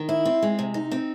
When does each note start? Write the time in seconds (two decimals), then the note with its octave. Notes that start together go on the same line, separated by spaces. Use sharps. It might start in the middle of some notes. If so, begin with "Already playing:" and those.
Already playing: D#3
0.09 E4
0.25 C4
0.42 G#3
0.59 C3
0.74 D#4
0.91 C4